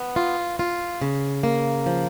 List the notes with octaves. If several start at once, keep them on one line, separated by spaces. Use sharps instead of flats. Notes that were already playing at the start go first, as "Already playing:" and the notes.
Already playing: B3
F4
F4
C#3
A#3
F3